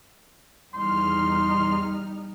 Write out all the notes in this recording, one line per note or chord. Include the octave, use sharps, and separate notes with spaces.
E2 G3 D#4 C6 F6